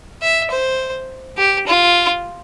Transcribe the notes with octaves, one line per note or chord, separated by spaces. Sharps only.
E5
C5
G4
F4